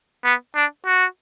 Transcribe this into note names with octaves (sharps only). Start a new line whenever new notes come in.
B3
D4
F#4